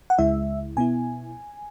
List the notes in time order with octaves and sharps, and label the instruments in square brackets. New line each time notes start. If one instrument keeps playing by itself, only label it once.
[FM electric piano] F#5
C#2 C#3 G#3 E4 E5
B2 B3 E4 G#5